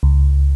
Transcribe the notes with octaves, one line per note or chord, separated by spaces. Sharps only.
C#2